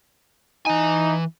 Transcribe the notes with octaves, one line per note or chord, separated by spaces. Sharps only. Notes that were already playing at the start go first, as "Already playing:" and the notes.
E3 D#4 G#5